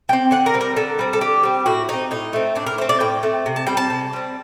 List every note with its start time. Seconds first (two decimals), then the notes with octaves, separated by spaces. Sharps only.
0.09 G3 C4 G5
0.31 D3 F#5
0.46 A#4
0.54 G3 C4
0.61 A#4
0.76 D3 A4
0.99 G3 C4
1.13 A4
1.21 D3 G4
1.43 G3 C4
1.66 A2 F#4
1.88 A3 C4 D#4
2.11 A2 D#4
2.33 A3 C4
2.55 A2 D4
2.66 A#4
2.78 A3 C5
2.82 C4
2.89 D5
3.00 A2 G5
3.23 A3 C4
3.46 C3
3.56 A5
3.67 G3 C4 G5
3.77 A5
3.90 C3
4.13 G3 C4